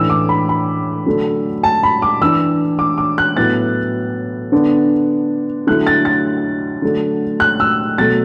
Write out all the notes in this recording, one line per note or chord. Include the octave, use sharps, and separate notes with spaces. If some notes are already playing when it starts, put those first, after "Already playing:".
Already playing: A2 E3 D4 E6
D6
B5
B5
D3 F#3 A3 D4
A5
B5
D6
E3 D4 E6
D6
D6
F#6
A2 F#3 B3 E4 A6
D3 B3 D4
D3 F#3 A3 E4 F#6
A6
A6
D3 F#3 A3 D4
F#6
E6
B2 F#3 A3 A6